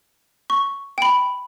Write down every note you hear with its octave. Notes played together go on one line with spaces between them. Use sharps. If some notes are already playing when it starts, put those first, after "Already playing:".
C#6
G5 B5